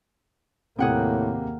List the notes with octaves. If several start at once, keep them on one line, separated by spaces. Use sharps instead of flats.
D#2 A2 C3 A#3 G#4 F#5 G5